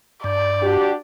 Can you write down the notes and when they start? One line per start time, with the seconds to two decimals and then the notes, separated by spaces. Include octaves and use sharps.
0.24 G2 D5
0.62 D4 F#4 G4